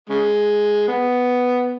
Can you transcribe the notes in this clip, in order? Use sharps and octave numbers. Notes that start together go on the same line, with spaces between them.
C#3 G#3
B3